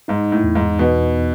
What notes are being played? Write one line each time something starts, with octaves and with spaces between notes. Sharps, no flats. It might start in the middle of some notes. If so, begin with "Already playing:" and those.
G#2 D#4
A2
E2
G#2
E2 B2